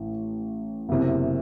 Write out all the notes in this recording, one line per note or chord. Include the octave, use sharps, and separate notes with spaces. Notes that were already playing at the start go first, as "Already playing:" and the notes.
Already playing: A1 A2 E3
F#1 E2 C3